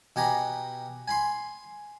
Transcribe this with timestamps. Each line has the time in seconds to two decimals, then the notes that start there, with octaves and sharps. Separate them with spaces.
0.16 B2 G4 G#5 A#5 B5
1.08 G#5 B5 C6